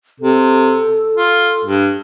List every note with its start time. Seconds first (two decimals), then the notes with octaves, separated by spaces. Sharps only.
0.20 C3 A4
1.17 F4
1.65 G2